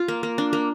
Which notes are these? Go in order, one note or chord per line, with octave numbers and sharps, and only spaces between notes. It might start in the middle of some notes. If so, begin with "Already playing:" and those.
Already playing: F4
A#3
A#3
D4
A#3